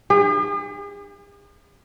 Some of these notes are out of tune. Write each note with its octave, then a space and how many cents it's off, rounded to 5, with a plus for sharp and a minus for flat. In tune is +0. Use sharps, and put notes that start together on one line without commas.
G#4 -45